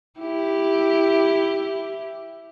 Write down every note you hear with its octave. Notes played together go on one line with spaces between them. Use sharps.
E4 G4